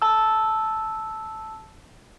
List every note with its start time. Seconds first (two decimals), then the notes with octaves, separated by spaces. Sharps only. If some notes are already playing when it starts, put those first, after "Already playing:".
0.02 A5 E6